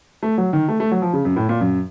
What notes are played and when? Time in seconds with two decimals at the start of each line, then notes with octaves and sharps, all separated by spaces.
0.23 A3
0.38 F#3
0.53 D#3
0.68 A3
0.80 A3
0.92 F#3
1.02 F3
1.13 C#3
1.25 F#2
1.36 A2
1.49 A#2
1.61 F#2